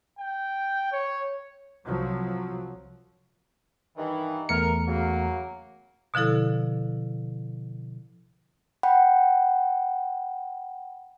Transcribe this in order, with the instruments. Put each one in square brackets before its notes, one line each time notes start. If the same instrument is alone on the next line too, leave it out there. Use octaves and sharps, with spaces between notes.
[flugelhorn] G5
C#5
[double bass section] C2 F3 F#3
[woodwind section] G2 D#3 E3
[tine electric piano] E2 A3 C#7 [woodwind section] A#4
[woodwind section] C#3 F#3 A#3
[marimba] B2 D3 F3 E4 A4
[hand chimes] F#5 G5 B5